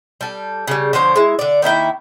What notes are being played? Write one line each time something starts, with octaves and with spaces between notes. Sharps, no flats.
G3 A4
C#3 G3
D3 F3 C5 C#5
G#3 E4
D3 D5
D#3 A#3 E4 G5